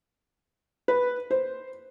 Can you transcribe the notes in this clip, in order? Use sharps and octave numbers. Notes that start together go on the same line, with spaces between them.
B4
C5